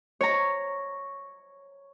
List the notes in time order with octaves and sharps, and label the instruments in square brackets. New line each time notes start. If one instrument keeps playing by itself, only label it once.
[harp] C#5 A#5